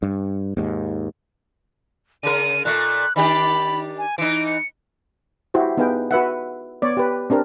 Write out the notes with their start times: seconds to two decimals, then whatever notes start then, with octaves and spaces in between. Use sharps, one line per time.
0.02 G2
0.57 D#2 G#2
2.23 C#3 A#4 D#7
2.65 A#2 A3 F#6
3.16 D#3 D4 G4 B5
3.98 G#5
4.18 E3 D#4 D7
4.47 C#7
5.54 E4 F#4 G4 C5
5.77 B3 D#4 G#4 B4 F5 G5
6.11 F#4 B4 E5 F#5
6.82 B3 C#5 D5
6.97 G4 B4
7.30 C4 D4 G4 A#4